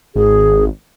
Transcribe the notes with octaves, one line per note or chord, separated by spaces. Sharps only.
G#1 G#4